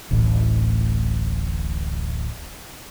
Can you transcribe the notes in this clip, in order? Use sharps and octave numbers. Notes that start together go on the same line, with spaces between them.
D1 A1